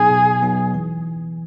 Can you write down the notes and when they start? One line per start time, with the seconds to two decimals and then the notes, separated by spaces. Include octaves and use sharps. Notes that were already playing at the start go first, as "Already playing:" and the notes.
Already playing: B2 F#3 B3 D#4 G#4
0.11 B2
0.42 F#3 B3 D#4
0.74 E3